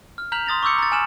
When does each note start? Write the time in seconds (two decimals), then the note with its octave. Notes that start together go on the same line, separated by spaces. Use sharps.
0.18 F6
0.32 A#5 F6 G6 B6 F7 F#7
0.46 C6 D#6 A6 A#6 F7
0.63 C#6 D6 E6 G6 C#7
0.78 A#5 A6
0.92 G#5 F6 E7 F#7